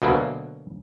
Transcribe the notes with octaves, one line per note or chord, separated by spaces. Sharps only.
D2 B2 F#3 A#3